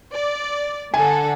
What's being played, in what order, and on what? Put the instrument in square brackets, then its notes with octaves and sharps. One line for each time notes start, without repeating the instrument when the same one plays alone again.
[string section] D5
[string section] D3 A4 F#5 [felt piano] G#5